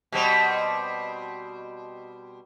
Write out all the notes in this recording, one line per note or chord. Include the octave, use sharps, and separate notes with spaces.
B2 G3 C4